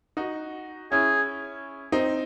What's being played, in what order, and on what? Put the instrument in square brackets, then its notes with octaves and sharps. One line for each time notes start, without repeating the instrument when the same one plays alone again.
[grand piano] D#4 F#4
[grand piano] C#4 E4 [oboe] G#4
[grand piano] C4 D#4